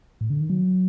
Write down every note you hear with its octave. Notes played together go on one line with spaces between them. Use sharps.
A2
D3
D#3
F#3